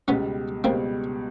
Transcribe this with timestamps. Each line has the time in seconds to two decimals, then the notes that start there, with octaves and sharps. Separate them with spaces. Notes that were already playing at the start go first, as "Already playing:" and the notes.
0.08 C#2 B2 G3 B3 C#4
0.64 C#2 B2 G3 A#3 C4